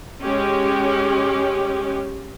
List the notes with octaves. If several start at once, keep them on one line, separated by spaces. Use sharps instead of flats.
G#3 C#4 G4